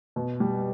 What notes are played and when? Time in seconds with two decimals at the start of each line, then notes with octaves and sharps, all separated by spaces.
0.16 B2
0.40 G3